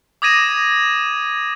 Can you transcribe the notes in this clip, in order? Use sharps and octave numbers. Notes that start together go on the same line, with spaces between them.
D6 D#6 G#6 A#6 D#7 E7